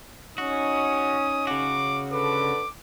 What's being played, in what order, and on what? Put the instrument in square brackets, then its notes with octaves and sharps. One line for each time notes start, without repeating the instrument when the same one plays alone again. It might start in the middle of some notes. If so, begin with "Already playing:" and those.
[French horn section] C#4 D#4 [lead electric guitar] F#4 [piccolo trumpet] D#6
[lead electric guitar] C#3 F#4 [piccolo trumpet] D6
[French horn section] D3 A4 B4 [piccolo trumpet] D6